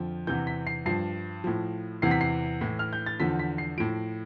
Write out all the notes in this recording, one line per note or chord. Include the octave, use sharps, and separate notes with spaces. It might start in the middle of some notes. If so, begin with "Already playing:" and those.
Already playing: F2 D3 F3
E2 C3 E3 G6
B6
C7
G2 F3 C7
A2 F3
E2 C3 E3 C7
B6
C7
A2 E3
F6
G6
A6
E2 D3 F3 B6
B6
C7
A2 F3 D7